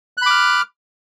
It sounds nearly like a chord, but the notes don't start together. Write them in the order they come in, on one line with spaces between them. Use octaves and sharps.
F#6 B5 D6 F6